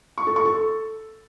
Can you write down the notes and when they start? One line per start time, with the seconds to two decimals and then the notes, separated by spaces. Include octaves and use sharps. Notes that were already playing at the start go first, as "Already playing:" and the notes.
0.18 C#6
0.27 A4
0.36 C#6
0.45 A4